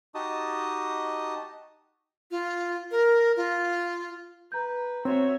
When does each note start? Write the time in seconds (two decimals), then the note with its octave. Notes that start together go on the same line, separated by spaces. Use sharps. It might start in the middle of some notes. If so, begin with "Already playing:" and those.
0.15 D#4 F#4 G4 D#5 A5 D#6
2.31 F4
2.91 A#4
3.36 F4
4.52 B4 A#5 G6
5.05 C4 F#4 C#5 E5